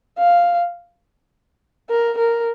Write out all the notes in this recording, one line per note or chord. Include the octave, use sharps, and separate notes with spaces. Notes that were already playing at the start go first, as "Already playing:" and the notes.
F5
A#4
A#4